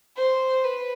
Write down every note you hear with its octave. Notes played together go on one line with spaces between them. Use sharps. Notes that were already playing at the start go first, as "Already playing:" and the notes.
C5
B4